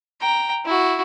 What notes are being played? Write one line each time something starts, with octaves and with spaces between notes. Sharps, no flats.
G5 A#5
E4 F#4